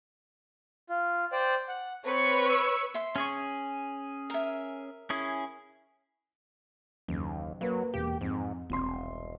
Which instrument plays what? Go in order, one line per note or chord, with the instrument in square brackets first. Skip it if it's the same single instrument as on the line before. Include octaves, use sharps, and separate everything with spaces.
[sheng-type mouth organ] F4
C5 D5 G5
F#5
[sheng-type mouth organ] C4 [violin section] B4 C#5 C#6
[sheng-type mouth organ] E6
[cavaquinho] E5 C6
[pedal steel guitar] C#4 G#4 [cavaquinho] G#5 C#6
[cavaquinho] A#4 E5
[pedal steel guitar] C#4 E4 G#4
[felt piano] F#1 [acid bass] D#2
[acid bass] F#3 [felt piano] A#3 B4
[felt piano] E1 A#3 [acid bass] G4
[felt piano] F2 [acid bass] G#2
[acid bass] E1 [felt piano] C2 C6